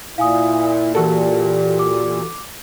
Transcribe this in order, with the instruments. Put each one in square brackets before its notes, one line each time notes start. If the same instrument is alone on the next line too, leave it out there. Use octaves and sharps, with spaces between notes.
[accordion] A#2 [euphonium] E4 [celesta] F5 G#5 D#6
[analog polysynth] E3 F#4 A4 [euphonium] G4 [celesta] A#4 A5
[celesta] D6